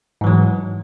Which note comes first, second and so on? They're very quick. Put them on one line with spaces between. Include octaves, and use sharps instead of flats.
G#2 E3 F#3